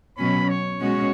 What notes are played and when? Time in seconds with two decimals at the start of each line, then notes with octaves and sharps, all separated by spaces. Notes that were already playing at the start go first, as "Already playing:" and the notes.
0.17 B2 F#3 C#4 B5
0.49 C#5
0.81 B2 G#3 C#4 F#4